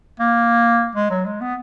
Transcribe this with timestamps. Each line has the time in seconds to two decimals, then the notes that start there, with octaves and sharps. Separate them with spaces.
0.20 A#3
0.95 G#3
1.10 F#3
1.26 G#3
1.41 B3